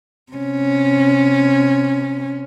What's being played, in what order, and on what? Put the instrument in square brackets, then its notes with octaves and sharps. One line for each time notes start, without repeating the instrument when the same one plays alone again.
[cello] C3 C#4